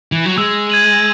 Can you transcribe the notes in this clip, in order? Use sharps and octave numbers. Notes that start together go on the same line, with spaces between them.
E3
F#3
G#3 E6
G#6 D#7 F#7